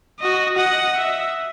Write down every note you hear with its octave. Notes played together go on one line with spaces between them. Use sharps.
F#4 D#5
D#5 F#5
E5